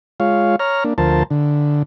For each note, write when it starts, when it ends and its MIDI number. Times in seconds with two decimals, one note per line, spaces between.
0.20 0.56 56
0.20 0.56 65
0.20 0.56 73
0.20 0.56 77
0.60 0.84 73
0.60 0.84 82
0.60 0.84 89
0.84 0.94 58
0.84 0.94 62
0.98 1.23 38
0.98 1.23 53
0.98 1.23 70
0.98 1.23 72
0.98 1.23 81
1.30 1.83 50